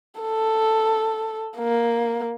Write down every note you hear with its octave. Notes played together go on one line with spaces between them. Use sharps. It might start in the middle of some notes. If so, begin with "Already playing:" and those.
A4
A#3